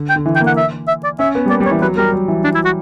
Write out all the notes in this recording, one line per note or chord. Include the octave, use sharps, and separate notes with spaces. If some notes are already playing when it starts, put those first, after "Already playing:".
Already playing: D3
G5
D3
E3
G5
A#3
F#5
E5
E5
D5
C#4 E5
B3
G3
A#3 D5
G3
C#5
E3
F#3 B4
G3 A#4
F#3
E3
D4
E4
F#4